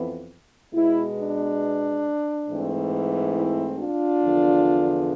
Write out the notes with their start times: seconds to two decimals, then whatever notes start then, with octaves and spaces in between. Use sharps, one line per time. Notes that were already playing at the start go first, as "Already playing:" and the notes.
Already playing: F2 E3 B3
0.73 B2 G#3 B3 E4
1.17 D4
2.47 G#2 E3 A3 C4
3.35 E4
3.78 D4 F4
4.23 E2 D3 F3